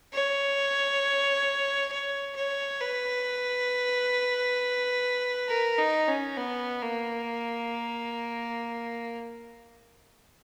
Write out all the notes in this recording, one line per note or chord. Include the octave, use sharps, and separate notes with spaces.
C#5
C#5
C#5
B4
A#4
D#4
C#4
B3
A#3